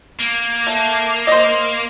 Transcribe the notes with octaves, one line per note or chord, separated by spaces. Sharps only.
A#3
A3
C5 D#5